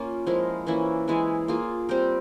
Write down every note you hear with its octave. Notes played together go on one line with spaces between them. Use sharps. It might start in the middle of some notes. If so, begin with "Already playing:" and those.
Already playing: A#3 C#4 F4
F3 G#3 E4 A#4
E3 A#3 C#4 E4
E3 G#3 E4 G#4
A#3 F4 G#4
G3 C4 G4 A#4